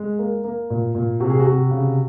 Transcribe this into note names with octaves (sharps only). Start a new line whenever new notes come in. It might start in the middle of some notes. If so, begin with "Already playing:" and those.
Already playing: G#3
A#3
A#3
A#2
A#2
C3 F#4
G#4
F#4
C3
C#3